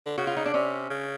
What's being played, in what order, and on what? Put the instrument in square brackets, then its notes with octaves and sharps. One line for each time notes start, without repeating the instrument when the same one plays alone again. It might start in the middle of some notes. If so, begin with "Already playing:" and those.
[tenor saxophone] D3
[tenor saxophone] C#3 [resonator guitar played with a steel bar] F#4
[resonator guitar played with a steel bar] F4
D#4
D4
[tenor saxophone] C3 [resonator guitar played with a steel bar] C#4
[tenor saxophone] C#3